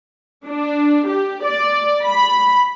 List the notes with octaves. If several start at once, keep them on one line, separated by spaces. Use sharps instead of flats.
D4
G4
D5
B5